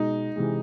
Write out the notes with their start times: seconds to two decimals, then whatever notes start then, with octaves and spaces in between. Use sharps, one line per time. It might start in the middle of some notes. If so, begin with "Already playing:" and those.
Already playing: B2 G#3 D#4
0.36 C3 E3 G#3